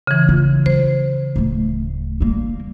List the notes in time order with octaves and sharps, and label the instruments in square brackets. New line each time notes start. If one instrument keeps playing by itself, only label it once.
[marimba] C#3 E3
[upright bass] F4
[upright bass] F#3 [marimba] C5
[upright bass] D1 A3
G3 A#3